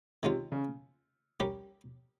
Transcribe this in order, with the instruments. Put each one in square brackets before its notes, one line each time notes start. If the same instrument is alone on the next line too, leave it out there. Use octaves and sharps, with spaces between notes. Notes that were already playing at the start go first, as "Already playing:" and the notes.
[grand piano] C3 [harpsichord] D#3 G#3 C#4 F4
[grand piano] C#3
[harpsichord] G3 C#4 G4 A#4